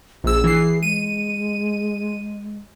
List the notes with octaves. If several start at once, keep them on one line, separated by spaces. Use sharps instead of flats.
A#1 G#4 E6
E3 C7
G#3 D#7